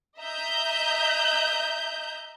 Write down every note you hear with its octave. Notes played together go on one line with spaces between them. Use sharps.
D#5 E5 A#5 G6